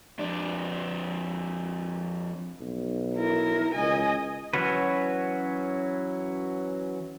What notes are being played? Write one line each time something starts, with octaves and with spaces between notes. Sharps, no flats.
F2 D4
B1
E4 A#4
C#2 D#5 G#5
E3 F#3 C#4 F#4 B4